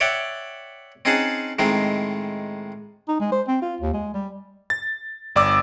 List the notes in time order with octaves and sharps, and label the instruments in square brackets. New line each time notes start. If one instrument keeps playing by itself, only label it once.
[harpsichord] C#5 D5 E5 F#5 G5
C4 C#4 D#4 G#4 F#5 A5
A2 D#3 G#3 C4
[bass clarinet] D#4
G#3
C5
C4
F4
D#2
G#3
G3
[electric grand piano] A6
G1 D5 D6 E6